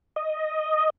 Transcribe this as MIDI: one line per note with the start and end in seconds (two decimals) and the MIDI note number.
0.16 0.90 75